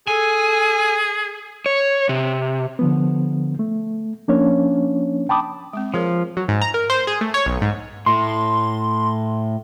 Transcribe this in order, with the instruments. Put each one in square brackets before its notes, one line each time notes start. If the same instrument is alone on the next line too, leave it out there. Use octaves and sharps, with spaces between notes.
[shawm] G#4 [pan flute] A4 [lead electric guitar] G#5
[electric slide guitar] C#5
C3
[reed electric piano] D3 F3 B3
A3
F3 A#3 C#4 D4 C#5
G5 A5 B5 D6 D#6
[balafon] G#3 C4
[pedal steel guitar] F3 [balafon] G#4 A#4 C#5
[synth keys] F#3
G#2
A#5
A#4
C5
G#4
A3
C#5
B1
G#2
[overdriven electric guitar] A2 [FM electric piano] C6